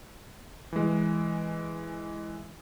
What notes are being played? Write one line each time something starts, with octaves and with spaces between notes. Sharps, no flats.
E3 G#3